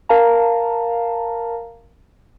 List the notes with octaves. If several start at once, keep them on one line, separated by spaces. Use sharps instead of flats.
A#4 F5 A5 A#5